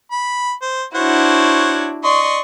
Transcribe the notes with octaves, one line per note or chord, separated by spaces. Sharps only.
B5
C5
D4 E4 F#4 C5 C#5 F#5
D5 D#5 C6 C#6